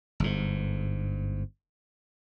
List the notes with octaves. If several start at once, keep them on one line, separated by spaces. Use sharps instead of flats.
G1 G#2